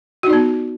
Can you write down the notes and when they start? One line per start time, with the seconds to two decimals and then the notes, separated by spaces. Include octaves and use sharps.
0.23 F#4
0.26 D#4
0.30 D5
0.33 B3